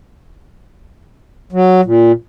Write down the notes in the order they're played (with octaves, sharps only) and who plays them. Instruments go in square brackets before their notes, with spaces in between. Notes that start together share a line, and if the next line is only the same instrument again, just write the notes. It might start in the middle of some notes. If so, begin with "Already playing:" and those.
[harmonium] F#3
A#2